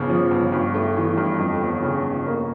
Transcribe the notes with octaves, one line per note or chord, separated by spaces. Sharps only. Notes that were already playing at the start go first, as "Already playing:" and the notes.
Already playing: G1 C#3
F3
G1
G2
A3
E3
G2
F2
G1
C#3
G1
A#3